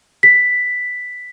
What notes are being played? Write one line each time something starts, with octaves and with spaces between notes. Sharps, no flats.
B6